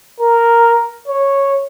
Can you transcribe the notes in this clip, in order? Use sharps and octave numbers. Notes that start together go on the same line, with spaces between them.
A#4
C#5